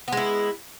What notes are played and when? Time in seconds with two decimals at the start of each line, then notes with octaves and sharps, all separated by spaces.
0.08 B3
0.12 G#3
0.17 E4